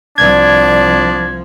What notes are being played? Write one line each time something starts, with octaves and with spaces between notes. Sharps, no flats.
C2 F3 D4 D5 G#6